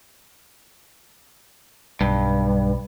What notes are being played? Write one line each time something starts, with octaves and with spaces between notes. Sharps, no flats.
B1 G2